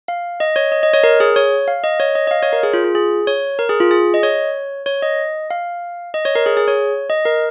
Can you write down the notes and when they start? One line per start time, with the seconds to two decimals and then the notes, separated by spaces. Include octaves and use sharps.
0.08 F5
0.40 D#5
0.56 C#5
0.72 D#5
0.83 D#5
0.94 C#5
1.04 A#4
1.20 G#4
1.36 C#5
1.68 F5
1.84 D#5
2.00 C#5
2.15 D#5
2.27 D#5
2.31 F5
2.42 C#5
2.53 A#4
2.63 G#4
2.73 F4
2.84 F4
2.95 G#4
3.27 C#5
3.59 A#4
3.69 G#4
3.80 F4
3.91 G#4
4.14 D#5
4.23 C#5
4.86 C#5
5.02 D#5
5.51 F5
6.14 D#5
6.25 C#5
6.35 A#4
6.46 G#4
6.57 G#4
6.68 C#5
7.10 D#5
7.25 A#4